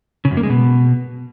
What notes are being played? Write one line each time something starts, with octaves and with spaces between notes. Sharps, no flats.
C#3
F#2
A#3
G#3
B2